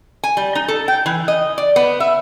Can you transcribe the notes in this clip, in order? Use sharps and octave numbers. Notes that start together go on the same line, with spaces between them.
G#5
G3
D#4
A4
G5
E3
D#5
D5
B3
E5